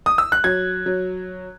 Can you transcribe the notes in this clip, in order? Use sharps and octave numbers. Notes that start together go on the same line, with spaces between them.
D#6
E6
F#6
F#3 G#6
F#3